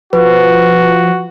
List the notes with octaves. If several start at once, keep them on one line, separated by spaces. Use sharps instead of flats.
F3 F#4 B4